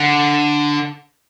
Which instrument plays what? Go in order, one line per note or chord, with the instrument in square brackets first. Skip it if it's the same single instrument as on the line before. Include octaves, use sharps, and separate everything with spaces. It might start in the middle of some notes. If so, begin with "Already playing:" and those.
Already playing: [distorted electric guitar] D3